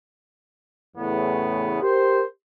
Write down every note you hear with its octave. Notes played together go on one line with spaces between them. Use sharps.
E2 A2 C#3 B3
G4 A#4 C5